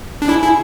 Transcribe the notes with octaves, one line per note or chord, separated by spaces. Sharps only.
D4
E4 G#4
E4